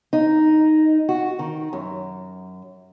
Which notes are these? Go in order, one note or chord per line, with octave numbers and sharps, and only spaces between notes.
D#4
F#4
D#3
F#2